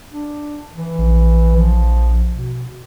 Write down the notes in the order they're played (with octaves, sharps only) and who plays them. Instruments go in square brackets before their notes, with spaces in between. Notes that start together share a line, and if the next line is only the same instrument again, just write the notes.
[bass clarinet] D4
E3
[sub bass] A#1
[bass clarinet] F3
B2